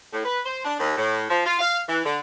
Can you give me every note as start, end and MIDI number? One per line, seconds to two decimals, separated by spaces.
0.13 0.22 45
0.25 0.40 71
0.46 0.64 72
0.65 0.76 62
0.79 0.95 39
0.97 1.24 45
1.30 1.42 53
1.46 1.57 65
1.59 1.80 77
1.89 2.01 52
2.05 2.20 50